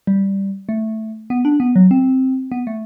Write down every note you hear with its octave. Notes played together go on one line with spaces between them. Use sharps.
G3
A3
B3
D4
B3
F#3
C4
B3
A3